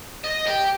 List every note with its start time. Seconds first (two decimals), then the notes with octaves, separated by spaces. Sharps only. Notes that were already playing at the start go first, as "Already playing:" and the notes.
0.24 D#5
0.47 G4